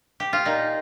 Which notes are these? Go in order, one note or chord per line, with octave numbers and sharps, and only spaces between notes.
G4
F4
A#2 D#4